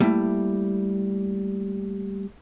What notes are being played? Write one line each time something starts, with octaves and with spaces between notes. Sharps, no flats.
G3 A3 A#3 E4